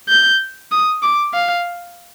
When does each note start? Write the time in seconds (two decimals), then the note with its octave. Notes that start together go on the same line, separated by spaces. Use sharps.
0.09 G6
0.72 D#6
1.03 D6
1.34 F5